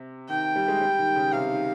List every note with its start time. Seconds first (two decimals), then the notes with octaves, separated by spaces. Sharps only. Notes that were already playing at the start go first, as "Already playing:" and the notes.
Already playing: C3
0.29 D#3 G5
0.56 G3
0.68 G#3
0.81 G3
0.99 D#3
1.16 C#3
1.32 C3 F5
1.50 D#3